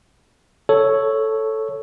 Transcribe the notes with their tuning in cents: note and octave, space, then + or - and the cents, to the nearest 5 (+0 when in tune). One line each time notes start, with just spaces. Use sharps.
A4 +0 C#5 +0